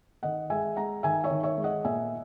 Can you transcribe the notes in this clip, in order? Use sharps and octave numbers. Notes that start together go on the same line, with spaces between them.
D#3 D#5 F#5
G#3 E5 G#5
G#3 F#5 A#5
D#3 E5 G#5
C#5 E5
D#3
C#5 E5
G#3
D#5 F#5
A#2 E5 G#5